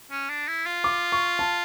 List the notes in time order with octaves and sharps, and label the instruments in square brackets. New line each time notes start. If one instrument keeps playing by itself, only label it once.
[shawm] C#4
D4
E4
F4
[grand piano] D6
C#6
A5